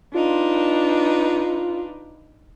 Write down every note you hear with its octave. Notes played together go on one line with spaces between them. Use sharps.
D4 D#4 F4 B4